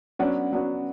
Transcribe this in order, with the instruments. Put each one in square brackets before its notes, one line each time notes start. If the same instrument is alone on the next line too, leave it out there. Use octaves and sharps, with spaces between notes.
[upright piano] F#3 B3 D4 F#4 [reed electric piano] C#4
[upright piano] F#3 B3 D4 F#4